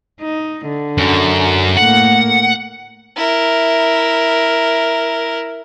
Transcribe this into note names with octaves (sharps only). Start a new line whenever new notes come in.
D#4
D3
F#2
A2 A#3 F#5
E4 A#4